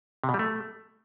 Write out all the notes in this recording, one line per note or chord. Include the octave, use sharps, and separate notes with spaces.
C3
B2
G3
A3